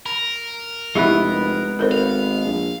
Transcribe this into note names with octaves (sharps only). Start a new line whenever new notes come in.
A#4 B5
F1 G#3 B3 E4 G4 B4 E5
G#1 A4 A#4 C5
F5
A#1